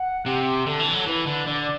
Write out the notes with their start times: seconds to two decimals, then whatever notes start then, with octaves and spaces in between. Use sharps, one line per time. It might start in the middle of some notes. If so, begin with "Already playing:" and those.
Already playing: F#5
0.26 C3 G4
0.66 D3 A4
0.80 E3
0.93 F#3
1.06 E3 B4
1.27 D3
1.47 D3 D5